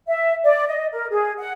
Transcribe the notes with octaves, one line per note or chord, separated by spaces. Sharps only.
E5
D5
D#5
A#4
G#4
F#5